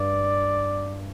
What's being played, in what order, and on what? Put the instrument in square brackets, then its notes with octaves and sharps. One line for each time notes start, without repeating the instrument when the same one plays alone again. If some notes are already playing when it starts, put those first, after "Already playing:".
Already playing: [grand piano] G2 [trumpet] D5